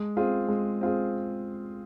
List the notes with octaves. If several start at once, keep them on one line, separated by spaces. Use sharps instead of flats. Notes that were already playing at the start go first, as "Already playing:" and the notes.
Already playing: G#3
C4 F4 G#4
G#3
C4 F4 G#4